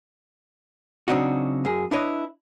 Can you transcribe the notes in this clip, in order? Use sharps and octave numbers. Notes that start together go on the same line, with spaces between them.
C#3 F#3 C4 D4 D#4 F#4
F#2 G#4
D4 E4 B4 C#5 D#5